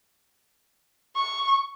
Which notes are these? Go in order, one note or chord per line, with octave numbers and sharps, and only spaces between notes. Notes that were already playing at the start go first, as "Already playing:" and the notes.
C#6